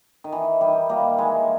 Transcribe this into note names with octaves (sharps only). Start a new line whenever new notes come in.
D#3
E3
D#3 G3
G3 A#3
E3 G#3